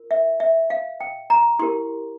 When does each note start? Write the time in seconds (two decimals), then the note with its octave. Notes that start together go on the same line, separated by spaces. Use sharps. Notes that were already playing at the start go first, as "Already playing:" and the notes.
Already playing: F4 A#4
0.11 E5
0.40 E5
0.70 F5
1.00 G5
1.30 A#5
1.59 E4 G4 A#4 C6